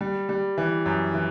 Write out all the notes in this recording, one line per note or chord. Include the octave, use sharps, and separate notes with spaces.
G3
G3
E3
F#2
E3